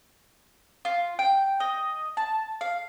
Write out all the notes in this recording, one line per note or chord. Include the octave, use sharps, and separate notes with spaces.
F4
G5
D#5
A5
F5